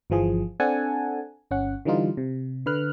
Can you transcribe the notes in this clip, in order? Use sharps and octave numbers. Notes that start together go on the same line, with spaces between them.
G1 E3 F3 G#4
C4 D4 A4 F#5 G#5 A5
G1 C#4 F#5
D3 E3 G3 D#4 F4
C3
D3 B4 F6 F#6